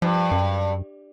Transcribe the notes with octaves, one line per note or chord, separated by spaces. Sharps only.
G2 F3
F#2